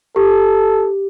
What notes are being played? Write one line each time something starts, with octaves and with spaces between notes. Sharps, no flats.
G4 A4